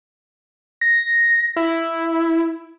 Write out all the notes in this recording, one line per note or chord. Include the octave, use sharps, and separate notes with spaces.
A#6
E4